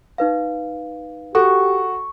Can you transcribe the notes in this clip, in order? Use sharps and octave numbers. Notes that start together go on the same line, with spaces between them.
D#4 B4 F5
F#4 G4 A4 C#6